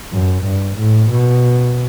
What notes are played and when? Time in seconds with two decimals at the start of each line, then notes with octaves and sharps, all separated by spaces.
0.12 F#2
0.45 G2
0.78 A2
1.10 B2